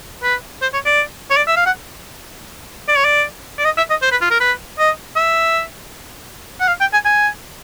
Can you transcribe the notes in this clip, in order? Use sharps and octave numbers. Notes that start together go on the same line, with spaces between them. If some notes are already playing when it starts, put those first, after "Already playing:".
B4
C5
C#5
D5
C#5
D5
E5
F5
F#5
D5
C#5
D5
D5
D#5
E5
D#5
C5
B4
F4
A#4
B4
D#5
E5
F#5
F5
G5
G#5
G#5